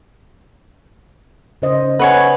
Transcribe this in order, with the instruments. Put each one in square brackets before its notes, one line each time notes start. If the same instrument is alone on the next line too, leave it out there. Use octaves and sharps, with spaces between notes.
[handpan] C#3 C5 D#5
[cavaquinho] B4 C#5 G#5 [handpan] F#5